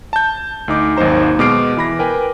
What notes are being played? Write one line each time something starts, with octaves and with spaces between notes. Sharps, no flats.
A5 G6
D2 D#4 D6
G#1 D#2 F#3 D#4 C5 A#5
B2 G#3 D6 F6 C7 D7
E3 B5 A#6
A#4 B4 G5 G#5